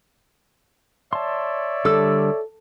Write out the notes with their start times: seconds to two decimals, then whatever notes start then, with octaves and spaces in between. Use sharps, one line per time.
1.13 C#5 D5 E5 A5 C6
1.85 D3 G3 A4 E6